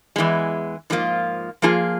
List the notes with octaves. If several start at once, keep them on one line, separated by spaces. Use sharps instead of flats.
E2 E3 G#3
G#2 F3 A#3 F4
F3 A#3 F4 G#4